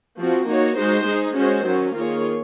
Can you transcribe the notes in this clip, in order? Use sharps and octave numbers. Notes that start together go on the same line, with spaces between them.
F3 C4 F#4
A#3 D#4 F#4 C#5
G#3 D#4 F#4 C5
G#3 D#4 G#4
G#3 C#4 F#4 C5
D#3 F#3 C#4
D#3 A#3 F4 G#4 C#5